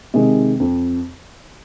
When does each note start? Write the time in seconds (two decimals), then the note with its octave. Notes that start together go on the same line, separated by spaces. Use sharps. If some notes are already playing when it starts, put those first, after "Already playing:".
0.14 C3 D#3 G#3
0.60 F2